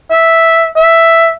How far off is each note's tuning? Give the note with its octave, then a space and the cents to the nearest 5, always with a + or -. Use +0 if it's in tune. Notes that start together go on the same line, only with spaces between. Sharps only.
E5 -5
E5 +5